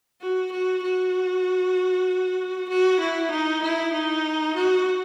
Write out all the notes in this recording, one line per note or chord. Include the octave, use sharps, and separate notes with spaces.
F#4
F#4
F#4
F#4
E4
D#4
E4
D#4
F#4